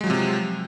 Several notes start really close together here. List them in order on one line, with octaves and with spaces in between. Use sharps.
G#3 F#3 F3 C3